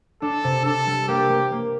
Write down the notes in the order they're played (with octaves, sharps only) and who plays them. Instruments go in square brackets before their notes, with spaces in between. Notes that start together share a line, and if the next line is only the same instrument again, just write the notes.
[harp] D4 [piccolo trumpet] A4
[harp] C3
[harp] D4 [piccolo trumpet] A4
[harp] G3
[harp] A#3 [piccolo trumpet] G4
[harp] A#3
A#3